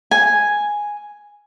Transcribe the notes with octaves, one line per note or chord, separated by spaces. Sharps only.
G#5